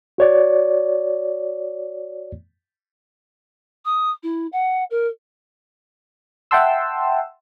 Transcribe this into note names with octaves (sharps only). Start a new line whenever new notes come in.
F#4 C#5 D5
D#6
E4
F#5
A#4
E5 F#5 G5 A5 C6 E6